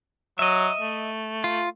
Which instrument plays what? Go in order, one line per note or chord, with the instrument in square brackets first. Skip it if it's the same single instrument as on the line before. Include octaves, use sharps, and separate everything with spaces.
[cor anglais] F#3 [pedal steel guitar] D#5 E5
[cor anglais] A3
[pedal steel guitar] F4